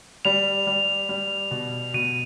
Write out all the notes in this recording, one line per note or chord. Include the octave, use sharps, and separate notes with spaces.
G3 F7
G3
G3
B2
B2 D#7